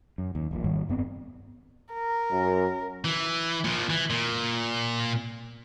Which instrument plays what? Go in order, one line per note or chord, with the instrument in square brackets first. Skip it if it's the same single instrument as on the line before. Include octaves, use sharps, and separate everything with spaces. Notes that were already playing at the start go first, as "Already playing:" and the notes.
[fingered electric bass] F#2
D#2
D#1 A#1 A#2
G#1 G#2 D#3 G3
F1 G2 B3 C4
[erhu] A#4
[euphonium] F#2
[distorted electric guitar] E3
A#2 F3
E3
A#2